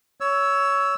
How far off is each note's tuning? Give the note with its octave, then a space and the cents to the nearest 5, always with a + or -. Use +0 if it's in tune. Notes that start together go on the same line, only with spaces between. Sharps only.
C#5 +15 E6 +0